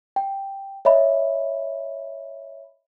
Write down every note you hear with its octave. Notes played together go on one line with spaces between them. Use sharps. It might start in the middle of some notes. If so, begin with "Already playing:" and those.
G5
C#5 D#5 E5 B5